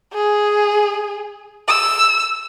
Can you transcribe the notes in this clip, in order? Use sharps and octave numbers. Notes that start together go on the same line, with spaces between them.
G#4
E6